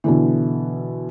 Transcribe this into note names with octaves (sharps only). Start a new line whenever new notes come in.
B2 D3 E3